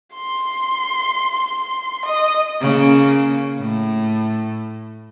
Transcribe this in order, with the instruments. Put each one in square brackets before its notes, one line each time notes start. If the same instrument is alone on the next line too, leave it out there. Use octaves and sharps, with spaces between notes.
[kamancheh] C6
D#5
[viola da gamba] C#3 A#3
A2